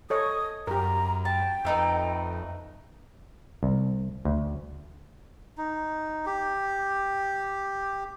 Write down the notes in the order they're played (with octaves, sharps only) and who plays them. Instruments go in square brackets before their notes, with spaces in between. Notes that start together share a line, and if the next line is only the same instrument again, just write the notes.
[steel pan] A4 C#5 D#5 [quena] D#6
[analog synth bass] F#2 [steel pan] G4 A#4 [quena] A#5
[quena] G5 [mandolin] A5
[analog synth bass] F2 [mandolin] A3 D#4 B4
[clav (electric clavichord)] C2
D2
[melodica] D#4
G4